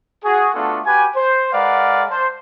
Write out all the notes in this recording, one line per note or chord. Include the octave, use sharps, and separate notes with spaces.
F#4 G#4
A3 B3 D4 F4 F#4 A4
F#4 G4 B4 G#5
C5
G#3 A#4 B4 D5 F5 F#5
C5 A5 C6